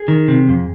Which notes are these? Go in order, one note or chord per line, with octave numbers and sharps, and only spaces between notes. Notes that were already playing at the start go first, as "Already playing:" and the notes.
Already playing: G#4
D#3
C3
F2